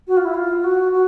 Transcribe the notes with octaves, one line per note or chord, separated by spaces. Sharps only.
F#4
F4
E4
F4
F#4
F#4